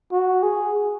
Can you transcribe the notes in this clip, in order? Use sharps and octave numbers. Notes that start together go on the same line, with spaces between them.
F#4
G#4